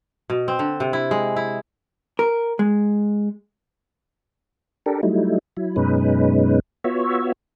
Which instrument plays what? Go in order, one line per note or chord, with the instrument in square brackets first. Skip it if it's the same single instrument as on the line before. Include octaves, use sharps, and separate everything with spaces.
[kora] B2
C4
D3
C3
E4
G#3
E4
[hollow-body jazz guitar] A#4
G#3
[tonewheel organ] D4 G4 A4 A#4
F#3 G3 A3 D#4 E4
F#3 E4
F#2 B2 G#3 C#4 D#4 B4
B3 F4 F#4 C#5 E5